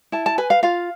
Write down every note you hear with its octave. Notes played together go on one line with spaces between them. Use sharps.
E4 A5
A5
B4 G#5
F5
F4 F5